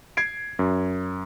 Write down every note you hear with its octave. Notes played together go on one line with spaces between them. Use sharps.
G#6 C7 D7
F#2